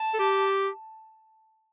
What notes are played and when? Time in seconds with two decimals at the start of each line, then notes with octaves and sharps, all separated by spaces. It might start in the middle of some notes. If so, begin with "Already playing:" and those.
Already playing: A5
0.14 A4
0.19 G4